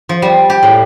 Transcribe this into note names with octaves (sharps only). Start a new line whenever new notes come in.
F3
G3
G4
A2